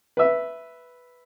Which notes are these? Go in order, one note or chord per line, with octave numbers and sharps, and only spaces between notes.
B4 E5